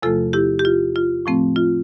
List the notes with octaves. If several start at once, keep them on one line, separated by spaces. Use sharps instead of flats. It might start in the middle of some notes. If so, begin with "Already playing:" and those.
E2 C3 F3 A3 F4 A4
E4 G4
G4
F4
F4
A2 F3 A3 C4
F4